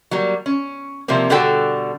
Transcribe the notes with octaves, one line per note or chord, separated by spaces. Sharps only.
F#3 G3 A#3
C#4
C3 F3 G3 A#3 C4
B2 D3 G3 F#4 A4 G5